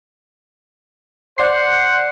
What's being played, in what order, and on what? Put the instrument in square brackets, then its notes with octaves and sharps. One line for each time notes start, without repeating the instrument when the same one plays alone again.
[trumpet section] C5 F#5 [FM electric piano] D5 C6 C7